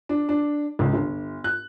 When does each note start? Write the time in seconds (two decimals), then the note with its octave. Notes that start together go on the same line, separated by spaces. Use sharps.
0.09 D4
0.29 D4
0.79 C#2
0.93 G1
1.44 F#6